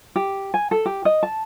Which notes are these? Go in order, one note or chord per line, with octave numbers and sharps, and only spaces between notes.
G4
G#5
A4
G4
D#5
A5